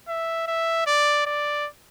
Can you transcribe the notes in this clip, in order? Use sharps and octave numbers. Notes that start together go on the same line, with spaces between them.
E5
E5
D5
D5